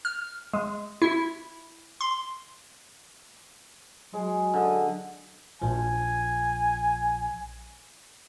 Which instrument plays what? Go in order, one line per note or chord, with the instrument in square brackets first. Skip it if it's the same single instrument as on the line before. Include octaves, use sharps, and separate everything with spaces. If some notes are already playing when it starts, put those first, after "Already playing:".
[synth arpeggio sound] F6
G#3
E4
C6
[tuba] F#3 [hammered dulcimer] G#3
[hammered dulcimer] D3 D#5
[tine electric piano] A#1 F3 [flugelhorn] G#5